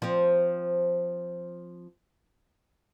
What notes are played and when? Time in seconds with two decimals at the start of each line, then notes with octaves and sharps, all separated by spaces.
0.02 F3 C4